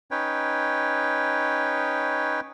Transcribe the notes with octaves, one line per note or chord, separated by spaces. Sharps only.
C#4 D#4 B4 C#5 G5